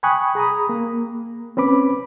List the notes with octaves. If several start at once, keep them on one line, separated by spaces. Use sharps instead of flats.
G5 G#5 B5 C#6 D#6 F#6
G#4 A#5 B5 D#6
A#3
C4 C#4 B4 B5 D6